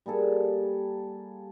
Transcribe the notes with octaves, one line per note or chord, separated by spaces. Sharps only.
G3 A#3 G#4 A4